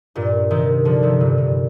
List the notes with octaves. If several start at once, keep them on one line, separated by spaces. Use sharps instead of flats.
G2 A#2
C3 D#3
D3 F3
C3 D#3
G2 A#2
G2